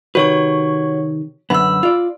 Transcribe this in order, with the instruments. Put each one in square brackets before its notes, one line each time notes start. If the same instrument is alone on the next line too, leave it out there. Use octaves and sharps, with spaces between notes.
[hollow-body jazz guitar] C3 D#3 B4 [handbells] F#4 C#5 C#6
[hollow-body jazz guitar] F#2 D3 B3 [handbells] B5 E6
[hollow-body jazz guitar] F4 D5